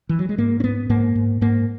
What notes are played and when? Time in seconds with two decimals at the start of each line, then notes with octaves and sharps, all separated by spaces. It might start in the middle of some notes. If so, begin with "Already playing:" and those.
0.09 E3
0.19 F#3
0.29 G#3
0.38 G#2 A#3
0.60 C#4
0.64 G#2 B3
0.89 G#2 A#3
1.15 G#2
1.41 G#2 A#3